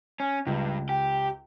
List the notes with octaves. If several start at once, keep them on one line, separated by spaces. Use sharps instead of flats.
C#4
C#2 G2
G4